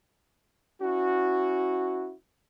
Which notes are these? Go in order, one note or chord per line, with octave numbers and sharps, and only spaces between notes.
C#4 E4 F#4